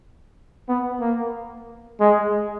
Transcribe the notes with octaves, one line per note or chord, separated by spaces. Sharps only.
B3
A#3
G#3